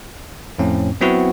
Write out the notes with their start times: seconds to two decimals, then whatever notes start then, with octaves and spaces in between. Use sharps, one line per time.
0.58 F2 A2 C4 C#4
1.01 F#3 B3 C4 E4 F#4